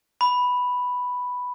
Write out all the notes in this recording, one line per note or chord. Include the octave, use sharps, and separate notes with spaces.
B5